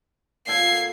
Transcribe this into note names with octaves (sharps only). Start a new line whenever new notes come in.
A#2 A4 F#5 G#6 C7